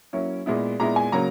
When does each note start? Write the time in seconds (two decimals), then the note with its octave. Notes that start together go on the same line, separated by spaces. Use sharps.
0.13 F#3 A#3 C#4 E4
0.46 A#2 G#3 B3 E4
0.80 A#2 G#3 B3 E4 A#5
0.96 G#5
1.12 C#3 F#3 A#3 A#5